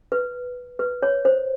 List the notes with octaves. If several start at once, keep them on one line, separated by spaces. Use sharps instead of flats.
B4
B4
C#5
C5